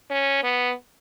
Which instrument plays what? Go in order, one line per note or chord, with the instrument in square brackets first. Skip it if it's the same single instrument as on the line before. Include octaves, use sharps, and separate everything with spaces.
[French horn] C#4
B3